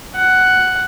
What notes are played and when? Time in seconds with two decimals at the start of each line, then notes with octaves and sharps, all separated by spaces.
0.16 F#5